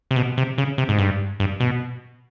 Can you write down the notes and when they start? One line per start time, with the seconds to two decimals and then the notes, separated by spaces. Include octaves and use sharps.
0.11 C3
0.16 B2
0.37 C3
0.58 C#3
0.78 C3
0.89 G#2
0.98 G2
1.40 G2
1.60 B2